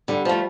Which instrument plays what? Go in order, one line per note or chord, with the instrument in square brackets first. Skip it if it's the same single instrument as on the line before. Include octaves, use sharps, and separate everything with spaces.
[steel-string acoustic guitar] D3 [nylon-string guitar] G3
[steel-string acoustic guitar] F3 A3